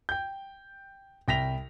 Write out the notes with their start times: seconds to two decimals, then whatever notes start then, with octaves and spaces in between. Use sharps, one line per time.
0.09 G5 G6
1.28 C2 G5 A#6 B6 F7